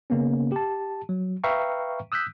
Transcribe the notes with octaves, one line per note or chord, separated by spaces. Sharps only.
C#3 A#3 B3 C#4
G4 A5
F#3
B4 E5 F5 G5 A#5 C#6
D#6 E6 F#6 G6 B6